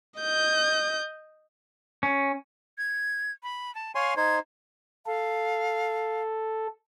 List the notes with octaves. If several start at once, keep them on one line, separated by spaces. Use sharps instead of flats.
D#5 G6
C#4
G#6
B5
A5
C#5 F5 G#5 C6
D#4 C5 G#6
A4 F5